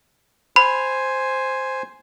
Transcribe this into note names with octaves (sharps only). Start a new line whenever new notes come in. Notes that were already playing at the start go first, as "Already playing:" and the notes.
C5 G#5 B5